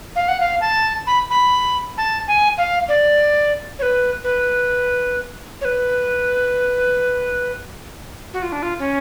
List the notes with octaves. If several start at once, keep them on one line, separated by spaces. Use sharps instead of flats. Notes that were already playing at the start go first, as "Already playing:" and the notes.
F5
F#5
F5
A5
B5
B5
A5
G#5
F5
D5
C#5
B4
B4
C#5
B4
F#4
F4
D4
F4
C#4